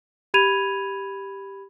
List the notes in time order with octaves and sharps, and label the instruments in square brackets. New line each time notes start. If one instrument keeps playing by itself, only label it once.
[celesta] G4 B5 G#6 D#7 F7